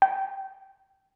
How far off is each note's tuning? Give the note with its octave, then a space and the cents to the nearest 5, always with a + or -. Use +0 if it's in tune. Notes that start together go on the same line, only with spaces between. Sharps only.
G5 -20